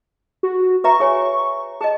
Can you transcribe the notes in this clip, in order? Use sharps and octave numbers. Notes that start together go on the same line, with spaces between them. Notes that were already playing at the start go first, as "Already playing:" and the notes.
F#4
B4 E5 A#5 C#6
G#4 C#5 G#5
G#4 D#5 A5